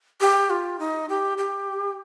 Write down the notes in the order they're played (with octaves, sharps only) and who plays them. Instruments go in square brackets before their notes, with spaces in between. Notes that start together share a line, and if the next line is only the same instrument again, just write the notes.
[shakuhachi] G4
F4
D#4
G4
G4